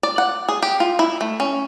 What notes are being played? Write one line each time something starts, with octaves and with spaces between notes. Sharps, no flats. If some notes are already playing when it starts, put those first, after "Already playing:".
D5
F#5
G#4
G4
F4
E4
A3
C#4